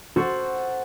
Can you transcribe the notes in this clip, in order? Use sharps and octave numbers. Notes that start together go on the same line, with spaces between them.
F#4 A4 C5 F#5